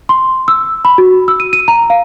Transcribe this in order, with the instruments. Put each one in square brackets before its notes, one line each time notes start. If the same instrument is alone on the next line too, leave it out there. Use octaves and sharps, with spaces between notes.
[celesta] C6
E6
B5
F#4
E6
D#7
D#7
A#5
F5